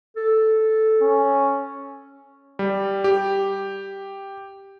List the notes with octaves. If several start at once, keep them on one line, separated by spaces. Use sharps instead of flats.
A4
C#4
G3
G4